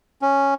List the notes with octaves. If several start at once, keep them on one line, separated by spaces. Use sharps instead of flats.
C#4